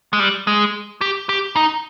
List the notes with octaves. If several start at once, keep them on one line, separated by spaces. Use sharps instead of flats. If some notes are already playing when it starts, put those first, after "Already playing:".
G#3
G3
G#3
G4
G4
D#4